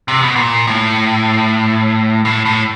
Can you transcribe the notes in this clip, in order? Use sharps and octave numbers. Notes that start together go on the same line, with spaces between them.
C3
B2
A#2
A2
A2
A2